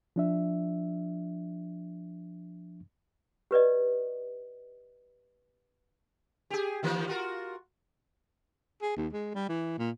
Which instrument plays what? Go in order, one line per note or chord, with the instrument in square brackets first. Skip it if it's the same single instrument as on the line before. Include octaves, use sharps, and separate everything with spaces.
[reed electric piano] F3 D4 E5
[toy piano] G4 B4 D5 D#5
[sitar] G4 G#4
D#3 E3 A#3
F4 F#4 A#4
[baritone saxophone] G#4
D#2
G#3
G3
E3
A#2